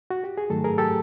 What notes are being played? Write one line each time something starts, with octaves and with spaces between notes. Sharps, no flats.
F#4
G4
G#4
G#2 D#3 F#3 A3 A4
G#4 A#4
G4 A4